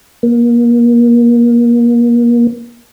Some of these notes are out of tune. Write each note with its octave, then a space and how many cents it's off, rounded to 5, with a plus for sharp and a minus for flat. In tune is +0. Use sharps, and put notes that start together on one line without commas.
A#3 +30